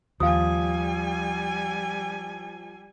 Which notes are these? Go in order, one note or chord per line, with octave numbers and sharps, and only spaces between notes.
D#2 F3 G3 F5 G#5 D#6